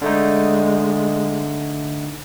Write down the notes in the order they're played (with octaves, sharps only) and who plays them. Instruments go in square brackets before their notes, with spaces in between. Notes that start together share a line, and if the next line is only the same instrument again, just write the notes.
[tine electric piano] D3 A3 D#4 [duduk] G#3